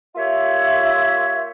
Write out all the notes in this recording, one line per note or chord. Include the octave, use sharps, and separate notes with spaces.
A#3 F4 G4 C#5 E5